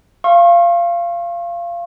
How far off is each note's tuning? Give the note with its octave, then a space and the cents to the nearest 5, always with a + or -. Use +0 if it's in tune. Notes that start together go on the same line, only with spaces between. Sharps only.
F5 -20 C#6 -45